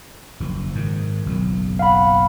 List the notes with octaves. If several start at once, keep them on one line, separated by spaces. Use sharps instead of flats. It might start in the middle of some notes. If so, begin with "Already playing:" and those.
F#1 F3
G#2 D#3
F#1 B1 F#3
F5 F#5 B5